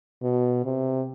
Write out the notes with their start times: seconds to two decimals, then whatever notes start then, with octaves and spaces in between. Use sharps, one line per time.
0.23 B2
0.65 C3